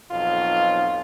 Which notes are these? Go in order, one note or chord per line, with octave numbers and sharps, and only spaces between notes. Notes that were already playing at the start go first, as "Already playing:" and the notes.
B1 F2 F4